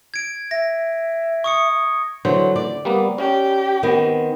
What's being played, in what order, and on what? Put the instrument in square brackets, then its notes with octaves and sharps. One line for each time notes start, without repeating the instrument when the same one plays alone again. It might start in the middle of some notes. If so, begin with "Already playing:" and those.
[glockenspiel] G#6 D7
[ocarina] E5 [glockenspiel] A#6
[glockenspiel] C#6 D#6 C#7
[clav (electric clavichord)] D3 E3 C5 [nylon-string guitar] F#3
[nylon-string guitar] D5
[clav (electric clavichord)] G3 A#3 B3
[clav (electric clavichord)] C#4 [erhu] G4
[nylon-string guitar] D#3 B3 C4